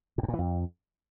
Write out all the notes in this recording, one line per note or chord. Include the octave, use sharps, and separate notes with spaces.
A2
F#2
A#2
E3
F2